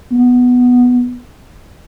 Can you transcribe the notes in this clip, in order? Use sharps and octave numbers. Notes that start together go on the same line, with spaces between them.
B3